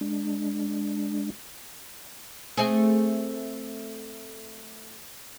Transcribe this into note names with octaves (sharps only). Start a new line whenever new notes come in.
G#3 D4
A3 C4 G#4